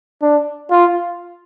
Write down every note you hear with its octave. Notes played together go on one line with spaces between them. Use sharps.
D4
F4